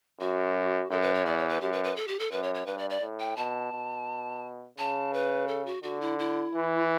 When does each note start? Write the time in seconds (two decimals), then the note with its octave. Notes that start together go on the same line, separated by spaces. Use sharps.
0.20 F#2 F#4
0.90 F#2 A4
1.02 B4
1.14 C#5
1.25 E2 D5
1.38 C#5
1.49 B4
1.61 F#2 G4
1.72 B4
1.84 B4
1.96 A4
2.08 G4
2.19 A4
2.31 F#2 B4
2.43 C#5
2.54 C#5
2.66 G2 B4
2.78 D5
2.90 D5
3.01 A2
3.20 G5
3.36 B2 A5
3.72 B2
4.78 C#3 A5
5.13 B4
5.48 A4
5.66 F#4
5.83 D3 F#4
6.01 E4
6.19 E4
6.54 E3